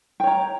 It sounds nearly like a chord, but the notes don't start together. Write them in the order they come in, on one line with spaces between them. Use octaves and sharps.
G5 C#5 A#5